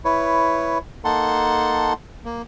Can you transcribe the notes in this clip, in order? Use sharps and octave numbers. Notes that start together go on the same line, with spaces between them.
E4 B4 C#5
A#3 D#4 A4 F#5 A5 C6
A#3